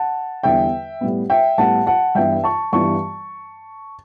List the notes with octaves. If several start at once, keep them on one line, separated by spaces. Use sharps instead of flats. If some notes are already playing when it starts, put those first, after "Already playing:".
Already playing: F#5 A5
E2 D3 G3 B3 E5 G5
A2 G3 B3
E5 G5
A2 G3 B3 F#5 A5
F#5 A5
G2 E3 G3 B3 E5 G5
A5 C#6
G2 E3 G3 B3 A5 C#6